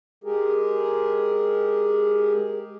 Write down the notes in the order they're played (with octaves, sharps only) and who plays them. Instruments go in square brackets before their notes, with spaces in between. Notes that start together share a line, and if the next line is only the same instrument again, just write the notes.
[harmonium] G#3 G4 G#4 A#4